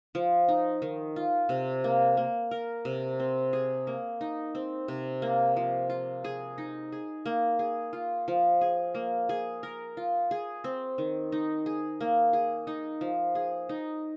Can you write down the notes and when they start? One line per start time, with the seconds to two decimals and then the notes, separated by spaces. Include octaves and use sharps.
0.15 F3
0.48 D#4
0.82 D#3
1.16 F4
1.49 C3
1.84 A#3
2.17 A#3
2.51 A#4
2.85 C3
3.20 C4
3.53 G#4
3.87 A#3
4.21 D#4
4.55 C4
4.88 C3
5.22 A#3
5.56 F3
5.90 F4
6.24 G#4
6.58 D#4
6.92 G#4
7.26 A#3
7.59 G#4
7.93 F4
8.28 F3
8.61 G#4
8.95 A#3
9.29 G#4
9.63 A#4
9.97 F4
10.31 G#4
10.64 C4
10.98 D#3
11.32 D#4
11.66 G#4
12.01 A#3
12.33 G#4
12.67 D#4
13.01 F3
13.35 G#4
13.69 D#4